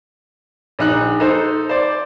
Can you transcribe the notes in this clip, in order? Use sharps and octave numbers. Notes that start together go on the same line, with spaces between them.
A#1 D#4 F#6
D#4 A4 C5
C5 D5